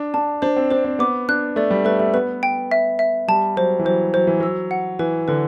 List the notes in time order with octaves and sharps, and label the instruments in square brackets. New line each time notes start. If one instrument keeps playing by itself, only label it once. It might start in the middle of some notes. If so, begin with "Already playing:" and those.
Already playing: [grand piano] D4
[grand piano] D4 [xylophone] A5
[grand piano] D4 [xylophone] C5
[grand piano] C4
[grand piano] D4 [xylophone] C5
[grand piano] C4
[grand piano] B3 [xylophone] D6
[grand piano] D4 [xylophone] F#6
[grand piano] A3 [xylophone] D5
[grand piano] G3
[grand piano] A3 [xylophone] B4
[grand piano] A3
[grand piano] B3 [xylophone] B4
[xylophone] G5
E5
E5
[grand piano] G3 [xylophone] A5
[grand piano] F#3 [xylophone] C5
[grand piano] E3
[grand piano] F#3 [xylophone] C5
[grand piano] F#3 [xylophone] C5
[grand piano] E3
[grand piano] F#3 [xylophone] E6
[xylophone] F#5
[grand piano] E3 [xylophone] B4
[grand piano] D3 [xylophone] B4